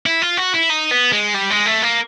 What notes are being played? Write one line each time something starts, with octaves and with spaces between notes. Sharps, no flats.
E4
F4
F#4
E4
D#4
B3
G#3
G3
G#3
A3
A#3